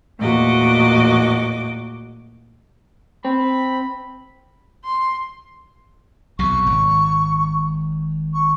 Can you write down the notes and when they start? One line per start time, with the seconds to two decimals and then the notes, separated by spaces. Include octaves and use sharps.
0.19 E2 A#2 A3 F#4 D#5 D6
3.25 C4 B5
4.85 C6
6.39 B1 E2 C3 C#6
6.66 G#1
8.34 C#6